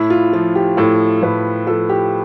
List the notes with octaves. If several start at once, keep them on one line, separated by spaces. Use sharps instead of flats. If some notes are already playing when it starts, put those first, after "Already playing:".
Already playing: A2 E4
F4
F3 F4
G4
A2 A4
A2 B4
F3 A4
G4